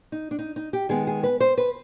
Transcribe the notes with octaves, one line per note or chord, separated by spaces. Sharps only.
D#4
D4
D#4
D#4
G4
D#3 G#3 B3 G#4
G#4
B4
C5
B4